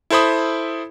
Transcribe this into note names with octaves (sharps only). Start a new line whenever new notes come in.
E4 A4 C5 B5 D#6